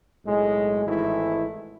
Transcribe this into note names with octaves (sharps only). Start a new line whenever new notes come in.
B1 A2 G#3
G#1 G#2 E3 A3 E4